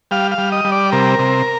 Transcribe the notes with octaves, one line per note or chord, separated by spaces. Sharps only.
G3 F5
F5
G3
D#5
G3
D5
C3 A#4
C3